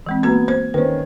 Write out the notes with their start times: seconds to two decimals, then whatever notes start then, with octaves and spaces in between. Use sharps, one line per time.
0.06 E3 G#3 C4
0.23 A#3 B3 F#4 A#5 G#6
0.48 C5 G#6
0.74 D#3 C#4 B4 C5